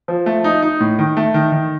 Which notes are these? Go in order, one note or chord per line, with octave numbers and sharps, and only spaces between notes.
F3
A3
D#4
D#4
A2
D#3
A3
D#3
D#3